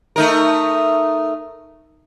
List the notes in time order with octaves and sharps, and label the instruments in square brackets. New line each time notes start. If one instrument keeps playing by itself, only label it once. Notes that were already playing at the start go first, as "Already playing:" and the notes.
[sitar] A3 D#4 A#4